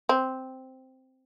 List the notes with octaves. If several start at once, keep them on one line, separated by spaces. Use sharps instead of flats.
C4